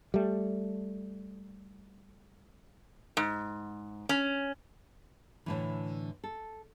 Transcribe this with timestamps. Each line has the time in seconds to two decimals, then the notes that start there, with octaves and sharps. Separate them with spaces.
0.14 G3 A3
3.17 G#2
4.09 C#4
5.46 A2 D3 E3
6.24 A4